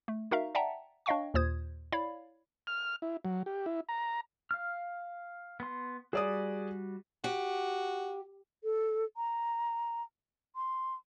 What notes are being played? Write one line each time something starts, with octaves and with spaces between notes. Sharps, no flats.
A3
D#4 F#4 A#4 E5 F5 A#5
D5 E5 F#5 G5 A5 A#5
D4 C#5 D#5 F5 G5 C#6
D#2 A#2 F4 C5 D#6 G#6
E4 C#5 D5 F5 B5
F6
E4
F#3
G4
E4
A#5
F5 F6
B3 C6
G3 F#4 G#4 D5 D#6
F#4 G4
A4
A#5
C6